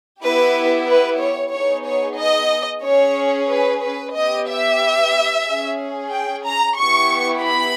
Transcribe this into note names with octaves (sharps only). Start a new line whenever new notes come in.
B3 E4 G4 B4
B4
C#5
B3 D#4 G#4 C#5
C#5
D#5
C#4 G#4 C#5
B4
B4
B3 G4 D#5
E5
C#4 G#4
G5
A#5
B3 E4 G4 C#6
B5